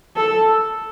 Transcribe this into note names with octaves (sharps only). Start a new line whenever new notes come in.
A4